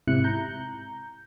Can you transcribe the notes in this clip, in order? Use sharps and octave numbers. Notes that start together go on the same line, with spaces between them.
G#2 C3 E4 F#6 C#7
A#5 G6